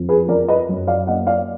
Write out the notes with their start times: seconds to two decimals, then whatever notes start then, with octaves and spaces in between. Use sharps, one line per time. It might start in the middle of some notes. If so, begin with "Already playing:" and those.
Already playing: F2
0.09 G#4 B4
0.29 F3 A#4 D5
0.48 B4 D#5
0.69 F#2
0.87 D5 F5
1.07 A#3 D#5 F#5
1.27 D5 F5